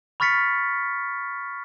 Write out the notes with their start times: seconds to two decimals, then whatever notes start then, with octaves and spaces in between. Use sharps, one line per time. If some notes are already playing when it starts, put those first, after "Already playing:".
0.20 B5 C#6 F6 A6 B6 C#7